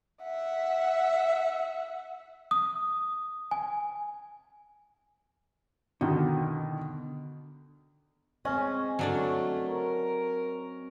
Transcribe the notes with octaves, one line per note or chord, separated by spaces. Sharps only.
E5 F#5
D#6
G#5
B2 D3 D#3
G#3 C4 C#4 D#5
F#3 A3 D4 D5
A#4